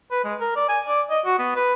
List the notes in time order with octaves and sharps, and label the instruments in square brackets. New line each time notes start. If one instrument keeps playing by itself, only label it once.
[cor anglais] B4
G#3
A#4
D5
G#5
D5
D#5
F#4
B3
B4